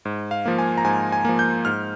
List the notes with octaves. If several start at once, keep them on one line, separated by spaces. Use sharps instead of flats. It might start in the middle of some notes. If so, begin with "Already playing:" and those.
G#2
F5
F3 A#3
G#5
A#5
G#2 G#5
G#5
F3 A#3
G6
G#2 F6